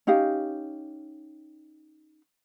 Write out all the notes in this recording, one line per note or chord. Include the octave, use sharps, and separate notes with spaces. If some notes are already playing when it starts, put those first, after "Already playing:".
C#4 D#4 G4 F5